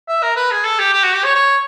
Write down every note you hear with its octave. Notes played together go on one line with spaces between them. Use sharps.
E5
A#4
B4
G#4
A4
G4
G4
F#4
G4
C#5
C#5